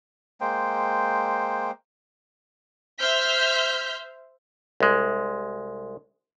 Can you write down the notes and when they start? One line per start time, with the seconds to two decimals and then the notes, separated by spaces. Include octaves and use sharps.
0.41 G#3 A#3 C5 G5
2.99 C5 E5 F6 G6 B6
4.80 C2 G#3